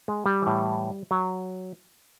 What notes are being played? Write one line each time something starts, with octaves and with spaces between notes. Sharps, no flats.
G#3
G3
A2 E3
F#3